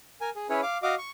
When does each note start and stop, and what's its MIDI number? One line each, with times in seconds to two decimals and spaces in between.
0.21 0.30 70
0.21 0.30 80
0.36 0.47 68
0.50 0.61 61
0.50 0.61 64
0.50 0.61 68
0.50 0.61 71
0.50 0.61 73
0.63 0.78 77
0.63 0.78 86
0.83 0.95 66
0.83 0.95 75
0.83 0.95 77
0.83 0.95 86
0.98 1.11 85